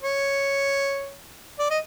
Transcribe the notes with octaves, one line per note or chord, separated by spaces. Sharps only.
C#5
D5
D#5